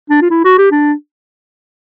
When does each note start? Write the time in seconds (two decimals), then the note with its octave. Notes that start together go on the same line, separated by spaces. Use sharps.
0.10 D4
0.22 F4
0.30 E4
0.44 F#4
0.58 G4
0.71 D4